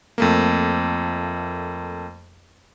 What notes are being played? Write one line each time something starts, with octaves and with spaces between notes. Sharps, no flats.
F2 A3 A#3